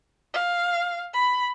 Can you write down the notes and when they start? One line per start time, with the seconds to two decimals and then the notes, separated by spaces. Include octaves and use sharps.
0.34 F5
1.14 B5